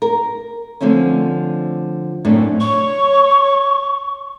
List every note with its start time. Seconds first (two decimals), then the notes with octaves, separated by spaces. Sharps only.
0.02 A#4
0.81 D3 F3 A3 C4 C#4
2.25 F#2 A2 C3 A3 D4
2.60 C#5 C#6